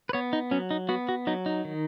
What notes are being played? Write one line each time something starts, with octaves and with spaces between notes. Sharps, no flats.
B4
B3 C#5
D#4
F#3 C#4
D#4
B3 F#4
F#4
F#3 D#4
D#4
D#3